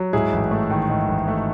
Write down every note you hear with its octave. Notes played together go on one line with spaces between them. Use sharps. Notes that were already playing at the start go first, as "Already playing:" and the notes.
Already playing: F#3
G#2 E4 G#4
A1
A3
D#3
G#2
A1
A3